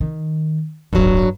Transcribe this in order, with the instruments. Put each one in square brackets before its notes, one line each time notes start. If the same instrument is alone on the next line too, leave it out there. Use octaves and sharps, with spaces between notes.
[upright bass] D#3
[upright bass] D1 G1 [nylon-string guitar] G2 F#3